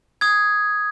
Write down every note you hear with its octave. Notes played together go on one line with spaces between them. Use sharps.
D#6 G#6